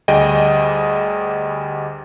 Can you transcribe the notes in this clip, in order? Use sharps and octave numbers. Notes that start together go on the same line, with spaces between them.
D2 G3 G#4 D#5 G5